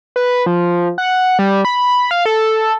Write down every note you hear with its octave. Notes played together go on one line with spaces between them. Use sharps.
B4
F3
F#5
G3
B5
F5
A4